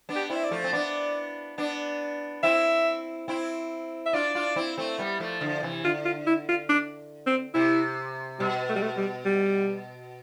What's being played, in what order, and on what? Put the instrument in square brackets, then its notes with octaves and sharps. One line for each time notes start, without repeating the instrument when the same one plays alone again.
[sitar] B3 D4
[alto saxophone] G4
[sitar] C4 E4
[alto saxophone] E5
D5
[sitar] F3 A3
C4
[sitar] B3 D4 [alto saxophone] D5
[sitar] B3 D4
[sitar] C4 E4 [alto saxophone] E5
[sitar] C4 E4
[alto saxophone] E5
[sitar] D4 F4 [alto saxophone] D5
[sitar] D4 F4
C4 E4
A3 C4
G3 B3
F3 A3
D3 F3
C3 E3
[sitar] D3 [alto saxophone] F4
[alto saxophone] F4
E4
F4
D4
C4
[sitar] C3 [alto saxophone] E4
[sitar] B2 [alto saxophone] G3
[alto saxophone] A3
G3
A3
G3
G3